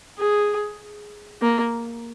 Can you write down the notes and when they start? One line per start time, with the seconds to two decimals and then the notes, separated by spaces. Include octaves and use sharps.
0.19 G#4
1.42 A#3